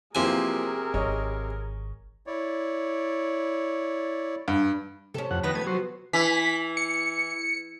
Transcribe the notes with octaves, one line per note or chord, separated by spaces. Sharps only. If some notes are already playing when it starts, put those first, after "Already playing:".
C3 E3 F3 A#3 G#4 A#4 G#5
G#1 C#5 D#5
E4 C#5 D5
G2
C3 C#4 A4
F2 F#5
C3 D#3 F3 B3 F#5 B5 A#6
A3 B4 G#6
F#3 F#4 C5
E3 B6
C#7